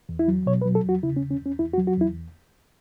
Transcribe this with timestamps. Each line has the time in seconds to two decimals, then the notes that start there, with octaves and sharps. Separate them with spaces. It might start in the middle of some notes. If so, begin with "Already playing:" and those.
0.09 E2
0.19 E4
0.28 F#3
0.46 B2 C#5
0.62 B4
0.65 F#3
0.75 A4
0.84 E2
0.89 F#4
1.03 C#3 E4
1.16 C#4
1.21 E2
1.31 C#4
1.41 E2 C#4
1.59 E2 E4
1.74 F#4
1.78 F#3
1.87 F#4
1.97 E2 E4